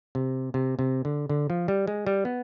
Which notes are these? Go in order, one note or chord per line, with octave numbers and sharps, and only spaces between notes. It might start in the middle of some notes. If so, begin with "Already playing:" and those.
C3
C3
C3
D3
D3
F3
G3
G#3
G3
B3